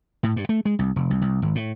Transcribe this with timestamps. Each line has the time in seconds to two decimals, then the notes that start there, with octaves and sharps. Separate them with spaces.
0.23 A2
0.36 G2
0.49 A3
0.65 G#3
0.79 C2
0.96 F1
1.10 C2
1.22 C2
1.42 G#1
1.55 A2